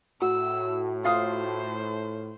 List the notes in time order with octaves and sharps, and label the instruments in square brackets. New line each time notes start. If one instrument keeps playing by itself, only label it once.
[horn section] A2 [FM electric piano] F#4 [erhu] E6
[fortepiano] F4 F5 D#6 [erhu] C5